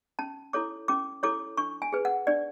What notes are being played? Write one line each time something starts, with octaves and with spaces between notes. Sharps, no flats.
C#4 A5
E4 A4 C#5 D6
C#4 D6
E4 A4 C#5 D6
D4 C#6
G#5
G#4 B4
F#5
D4 D5